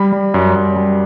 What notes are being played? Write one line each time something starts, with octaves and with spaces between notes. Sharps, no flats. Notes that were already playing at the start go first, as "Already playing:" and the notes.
Already playing: G3 B5
G3
F#2
F#2
G3